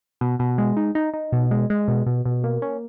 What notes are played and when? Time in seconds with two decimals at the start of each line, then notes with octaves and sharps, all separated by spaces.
0.21 B2
0.39 B2
0.58 G#3
0.77 D#4
0.95 D#4
1.14 D#4
1.32 B2
1.51 G#3
1.70 G#3
1.88 B2
2.06 B2
2.25 B2
2.44 A#3
2.62 C#4